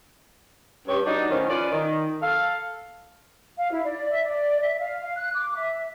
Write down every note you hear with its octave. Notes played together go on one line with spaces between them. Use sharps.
G2 C#4 G4 C#5
F#3 D4 D#4
A2 D#3 F3 C#4
C#4 F4 B4 D5
D#3
A4 F5
F5
E4
D5
E5
D5
E5
F5
F5
F#6
D6
E5